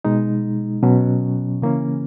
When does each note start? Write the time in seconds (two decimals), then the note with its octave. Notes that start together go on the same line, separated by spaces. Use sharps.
0.05 B2 G#3 D#4
0.82 B2 F#3 C#4
1.62 C#3 E3 A#3 C#4